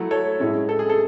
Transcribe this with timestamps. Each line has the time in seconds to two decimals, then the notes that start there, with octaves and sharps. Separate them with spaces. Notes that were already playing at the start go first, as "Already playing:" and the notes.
Already playing: F#3 A3 E4
0.11 A4 C#5
0.40 A2 G#3 C#4 E4
0.69 A4
0.79 G#4
0.89 A4